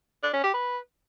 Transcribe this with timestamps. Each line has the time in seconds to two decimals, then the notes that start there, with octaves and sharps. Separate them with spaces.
0.23 D4
0.33 C#4
0.44 G4
0.54 B4